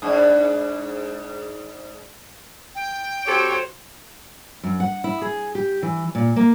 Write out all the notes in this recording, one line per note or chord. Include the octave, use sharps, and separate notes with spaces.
G#2 D4
G5
C4 F#4 G4 A4 C5 C#5
F#2
F#5
E4
G#4
G4
E3
A#2
A#3